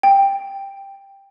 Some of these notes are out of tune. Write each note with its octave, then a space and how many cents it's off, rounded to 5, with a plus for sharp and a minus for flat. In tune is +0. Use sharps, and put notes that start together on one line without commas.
G5 +10